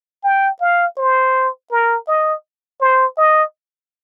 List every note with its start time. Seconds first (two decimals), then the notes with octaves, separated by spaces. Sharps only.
0.24 G5
0.61 F5
0.97 C5
1.71 A#4
2.08 D#5
2.81 C5
3.18 D#5